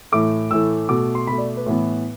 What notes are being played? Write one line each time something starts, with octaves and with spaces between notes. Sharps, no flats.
A2 E3 A3 D6
A2 E3 A3 E6
B2 A3 D6
C6
B2 A3 B5
D5
B4
A2 E3 B3